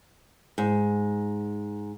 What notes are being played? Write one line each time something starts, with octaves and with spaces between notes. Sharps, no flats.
G#2